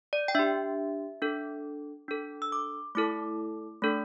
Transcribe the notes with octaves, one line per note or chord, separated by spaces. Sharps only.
D5
G5
D4 G4 E5
D4 A4
D4 A4
E6
D6
A3 E4 A4 D6
A3 D4 A4